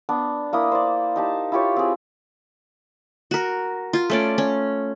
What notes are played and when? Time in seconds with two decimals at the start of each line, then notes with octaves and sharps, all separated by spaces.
0.09 B3 D4
0.53 A#3 E4 D#6
0.72 C5 D5
1.16 D#4 G4 A5
1.52 E4 F4 G4 C#5
1.76 C4 G#4
3.31 F#4 A#4
3.93 F4
4.10 A3 C#4 D5
4.38 C#4